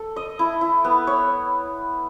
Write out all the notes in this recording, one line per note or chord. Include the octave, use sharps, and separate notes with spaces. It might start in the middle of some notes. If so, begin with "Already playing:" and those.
Already playing: A4
D#5
E4
E4
B3
C#5